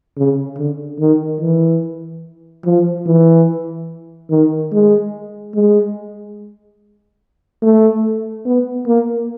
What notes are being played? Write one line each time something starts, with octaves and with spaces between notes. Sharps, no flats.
C#3
D3
D#3
E3
F3
E3
D#3
G#3
G#3
A3
B3
A#3